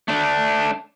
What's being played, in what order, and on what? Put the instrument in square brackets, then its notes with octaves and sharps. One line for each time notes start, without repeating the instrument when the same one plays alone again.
[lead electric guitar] A3 D4